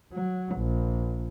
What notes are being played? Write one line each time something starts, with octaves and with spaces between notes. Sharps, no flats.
F#3
A#1